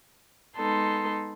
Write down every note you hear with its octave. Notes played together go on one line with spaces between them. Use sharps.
G#3 B3 D#4 A4 C6